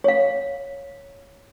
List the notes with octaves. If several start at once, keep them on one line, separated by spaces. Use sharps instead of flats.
C#5 F5